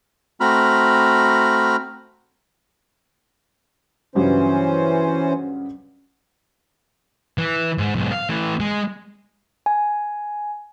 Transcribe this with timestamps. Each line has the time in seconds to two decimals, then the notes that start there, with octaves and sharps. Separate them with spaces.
0.40 A3 C4 F#4 A#5 B5 F6
4.15 G2 C#3 E3 F#3 C#4 C5
7.38 E3
7.78 G#2
7.96 B1 G#2
8.11 F5
8.29 E3 A3
8.60 G#3
9.66 G#5